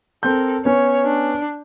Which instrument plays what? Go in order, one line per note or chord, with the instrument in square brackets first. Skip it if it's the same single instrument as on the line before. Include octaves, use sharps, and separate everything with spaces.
[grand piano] C4 G6 [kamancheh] A4 A#4
[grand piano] B3 C#4 [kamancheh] C#5
[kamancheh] D4